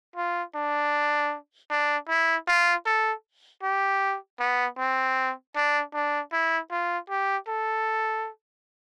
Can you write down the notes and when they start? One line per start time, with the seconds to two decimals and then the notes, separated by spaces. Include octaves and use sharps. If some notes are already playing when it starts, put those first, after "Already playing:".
0.16 F4
0.55 D4
1.70 D4
2.09 E4
2.48 F4
2.86 A4
3.63 G4
4.40 B3
4.78 C4
5.56 D4
5.94 D4
6.32 E4
6.71 F4
7.10 G4
7.48 A4